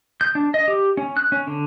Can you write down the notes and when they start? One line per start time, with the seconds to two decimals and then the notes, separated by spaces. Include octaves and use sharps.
0.21 G6
0.35 D4
0.54 D#5
0.68 G4
0.97 C#4
1.17 F#6
1.32 C#4
1.47 D3